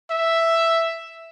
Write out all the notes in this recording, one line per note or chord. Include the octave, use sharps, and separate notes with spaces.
E5